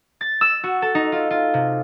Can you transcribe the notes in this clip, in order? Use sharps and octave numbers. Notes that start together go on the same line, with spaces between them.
A6
E6
F#4
A4
D#4
F4
F4
C3